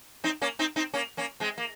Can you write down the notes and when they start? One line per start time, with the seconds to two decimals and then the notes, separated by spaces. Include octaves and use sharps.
0.24 C4 D#4
0.42 A#3 C#4
0.59 C4 D#4
0.76 C4 D#4
0.94 A#3 C#4
1.17 A#3 C#4
1.40 G#3 C4
1.58 A#3